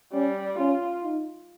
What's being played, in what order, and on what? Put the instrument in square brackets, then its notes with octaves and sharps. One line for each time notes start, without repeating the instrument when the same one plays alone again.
[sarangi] G3 [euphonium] C#4
[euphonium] C#4 [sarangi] F4
[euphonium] D#4